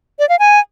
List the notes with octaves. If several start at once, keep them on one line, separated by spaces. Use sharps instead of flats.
D5
F5
G#5